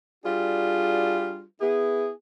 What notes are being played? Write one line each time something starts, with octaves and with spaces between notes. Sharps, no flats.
G3 D4 F4 F#4 G#4
B3 E4 G#4